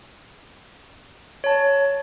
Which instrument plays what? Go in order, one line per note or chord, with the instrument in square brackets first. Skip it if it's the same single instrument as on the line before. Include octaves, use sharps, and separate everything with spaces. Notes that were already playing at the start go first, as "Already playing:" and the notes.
[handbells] C#5 A5